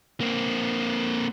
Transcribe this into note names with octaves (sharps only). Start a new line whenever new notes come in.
A#3 C4